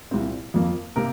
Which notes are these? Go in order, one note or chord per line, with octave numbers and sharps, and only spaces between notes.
C2 A#2 G3 C4
F2 F3 A#3
C3 A#3 A#4